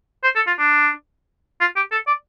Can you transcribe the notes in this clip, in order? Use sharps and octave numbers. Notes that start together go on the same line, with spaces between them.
C5
A4
F4
D4
F4
G4
A4
D5